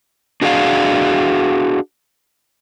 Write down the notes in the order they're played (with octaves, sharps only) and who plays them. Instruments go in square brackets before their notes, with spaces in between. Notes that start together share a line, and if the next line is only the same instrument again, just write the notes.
[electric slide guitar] D4 F#4 G#4 D5 F5